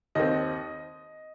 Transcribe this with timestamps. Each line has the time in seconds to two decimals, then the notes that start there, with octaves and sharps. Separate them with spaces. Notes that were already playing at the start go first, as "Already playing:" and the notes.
0.15 D#2 D#3 C4 D#5